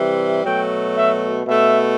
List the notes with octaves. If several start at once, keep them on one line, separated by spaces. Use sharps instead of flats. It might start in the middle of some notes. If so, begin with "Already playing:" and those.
Already playing: C3 E3 G3
B2 F#3 A3 G5
E5
B2 A3 E5